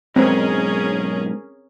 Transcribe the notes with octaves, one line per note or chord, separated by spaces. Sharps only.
B1 G#2 C4 C#4 G#4 A#4